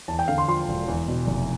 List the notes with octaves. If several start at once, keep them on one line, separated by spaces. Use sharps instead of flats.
E2 A5
G5
D3 F5
C6
F3 C6
E1
E2
B2
F1